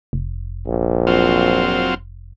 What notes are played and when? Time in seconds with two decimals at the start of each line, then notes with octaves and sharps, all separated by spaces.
0.13 F1
0.67 A#1
1.07 F#3 C4 F4